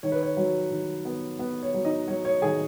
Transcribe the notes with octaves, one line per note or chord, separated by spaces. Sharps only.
D#3 C#5
B4
C#5
F#3
D#3
B3
B3 B4
C#5
F#3
D#4 D#5
F#3 C#5
C#5
D#3 G#4 G#5